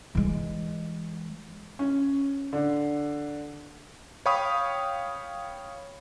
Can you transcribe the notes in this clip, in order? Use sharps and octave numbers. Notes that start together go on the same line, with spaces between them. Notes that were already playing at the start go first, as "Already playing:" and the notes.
E3 G#3
C#4
D3
C#5 F5 G5 B5 C#6 D#6